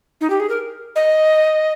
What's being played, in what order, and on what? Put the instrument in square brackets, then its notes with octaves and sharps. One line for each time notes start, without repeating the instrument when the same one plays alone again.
[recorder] D#4
G4
G#4
A#4
D#5